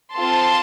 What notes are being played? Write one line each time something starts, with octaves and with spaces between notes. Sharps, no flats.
C4 F4 A4 A5 C6